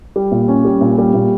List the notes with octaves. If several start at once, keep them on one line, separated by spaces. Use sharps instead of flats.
G3
A#2
C#4
G3
A#2
G3
A#2